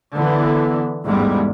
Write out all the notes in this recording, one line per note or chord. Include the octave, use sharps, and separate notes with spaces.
D3 E3 B3
A1 E2 G#2 G3 G#3